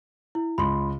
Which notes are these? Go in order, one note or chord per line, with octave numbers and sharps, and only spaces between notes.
E4
C#2 B5 C6